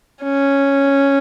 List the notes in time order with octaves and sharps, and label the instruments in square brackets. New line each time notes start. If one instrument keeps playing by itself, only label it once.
[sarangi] C#4